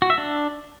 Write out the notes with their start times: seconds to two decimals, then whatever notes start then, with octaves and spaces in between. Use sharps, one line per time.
0.02 F#4
0.10 E5
0.18 D4